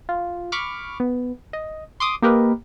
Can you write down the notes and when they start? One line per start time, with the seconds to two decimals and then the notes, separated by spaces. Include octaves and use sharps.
0.09 F4
0.52 B5 C#6 D6 F6
1.00 B3
1.53 D#5
2.00 C6 D6 D#6
2.22 A#3 G4 A#4 B4 D#5